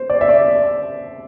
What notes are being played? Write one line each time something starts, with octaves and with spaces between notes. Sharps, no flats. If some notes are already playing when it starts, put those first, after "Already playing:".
Already playing: C5
D5
E5
D5